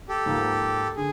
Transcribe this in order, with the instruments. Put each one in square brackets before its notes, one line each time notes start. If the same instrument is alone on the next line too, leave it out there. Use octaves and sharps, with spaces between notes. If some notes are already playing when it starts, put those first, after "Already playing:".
[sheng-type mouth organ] G4 A4
[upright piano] G#2 F3 A#3
[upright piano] D3 [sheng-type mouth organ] G#4